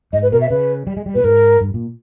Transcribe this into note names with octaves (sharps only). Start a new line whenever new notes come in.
G#2 D#5
B4
B2 A#4
E5
C#3 B4
G3
G#3
G3
A#2 B4
G#2 A#4
G2
A#2